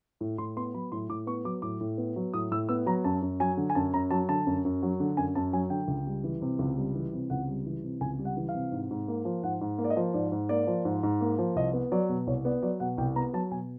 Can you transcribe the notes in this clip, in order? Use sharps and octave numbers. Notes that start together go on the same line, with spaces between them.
A2
A2 C6
B3 C6
F#3 B5
A2 C6
A2 D6
B3 C#6
F#3 D6
A2 D6
A2
B3
F#3
A2 D#6
A2 E6
B3 E6
F#3 A#5
F#2 A5
F#2
F#3 G#5
D3
G#5
F#2 A5
F#2 A#5
F#3 A5
D3 A5
F#2
F#2
F#3
D3
F#2 G#5
F#2 A5
F#3 G#5
D3 G5
C#2
G3
E3
C3
C#2
G3
E3
C3
C#2 F#5
G3
E3
C3
C#2 G#5
G3
F#5
E3
F5
C3
G#2
G#2
A#3
F3
G#2 F#5
G#2
A#3
D5
D#5
F3
G#2 D5
G#2
A#3 D5
F3
G#2
G#2
A#3
F3
C2 D#5
B3
F#3 D5
B2
C2 C#5
B3 D5
F#3 D5
B2 F#5
C2 G5
B3 A#5
F#3 A5
B2 G#5